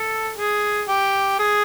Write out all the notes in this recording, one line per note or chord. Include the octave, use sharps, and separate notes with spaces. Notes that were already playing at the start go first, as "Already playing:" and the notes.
Already playing: A4
G#4
G4
G#4